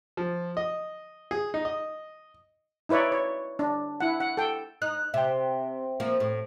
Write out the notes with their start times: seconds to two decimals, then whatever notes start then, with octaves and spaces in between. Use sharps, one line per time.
0.17 F3
0.57 D#5
1.31 G#4
1.54 D#4
1.65 D#5
2.89 D#4 E4 B4 C#5 D5
3.12 C#5
3.59 D4
4.00 E4 F#5
4.20 F#5
4.37 A4 G5
4.82 D#4 F#6
5.14 C3 E5 G5
6.00 F3 A#3
6.20 A2